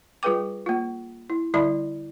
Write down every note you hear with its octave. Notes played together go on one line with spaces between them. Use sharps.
G3 F4 G#4 B4 G5 D6
A#3 F4
E4
D3 G3 E4 D5 E5 B5